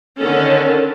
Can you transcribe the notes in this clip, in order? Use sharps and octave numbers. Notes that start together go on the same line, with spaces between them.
D3 D#3 C#4 A4